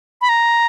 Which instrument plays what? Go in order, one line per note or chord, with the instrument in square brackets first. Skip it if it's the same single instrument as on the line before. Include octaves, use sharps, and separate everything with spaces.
[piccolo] B5
A#5